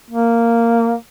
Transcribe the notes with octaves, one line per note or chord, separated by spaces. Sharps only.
A#3